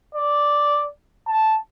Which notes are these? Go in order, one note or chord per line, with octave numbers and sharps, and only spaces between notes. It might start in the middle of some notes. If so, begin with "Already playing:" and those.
D5
A5